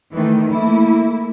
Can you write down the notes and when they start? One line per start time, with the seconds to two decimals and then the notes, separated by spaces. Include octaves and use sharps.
0.12 D#3 E3 A3
0.49 A3 A#3 E4